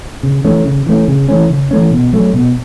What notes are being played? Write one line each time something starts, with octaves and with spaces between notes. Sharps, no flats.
C#3
E3 A3 C#4
C#3
E3 A3 C#4
C#3
E3 A3 C#4
C#3
E3 A3 C#4
B2
F#3 A3 C#4
B2